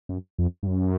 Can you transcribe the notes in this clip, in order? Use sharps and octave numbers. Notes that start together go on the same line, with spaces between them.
F#2
F2
G2
F#2